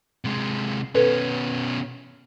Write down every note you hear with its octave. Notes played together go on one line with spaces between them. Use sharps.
C3 G#3
B2 C#4 A4 B4